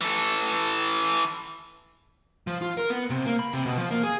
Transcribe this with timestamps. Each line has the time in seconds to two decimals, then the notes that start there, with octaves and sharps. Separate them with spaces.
0.01 E3 A4
2.47 F3
2.62 F4
2.77 A#4
2.90 B3
3.10 C3
3.26 A#3
3.39 B5
3.53 C3
3.66 B2
3.78 F3
3.91 A#3
4.03 G#4